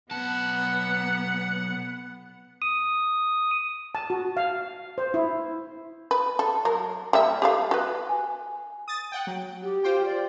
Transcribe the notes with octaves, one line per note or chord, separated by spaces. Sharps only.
B1 B3 F#5 A5
D#6
A5
F#4
F5
C5
E4
B4
A4
F#3 A#4
G3 A#3 E5
G4 A4 F5
F#4 B4
G#5
D#6 A6
F#5 G5
F#3
G4
F4 C5 G5
D5